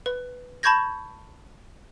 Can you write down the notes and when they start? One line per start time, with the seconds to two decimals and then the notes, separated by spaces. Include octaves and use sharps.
0.06 B4
0.63 A5 B5 C#6 G6 G#6 A#6